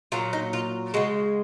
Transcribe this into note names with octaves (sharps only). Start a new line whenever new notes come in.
A#2 F#3 F4
D#4
F4
C#3 G#3 F#4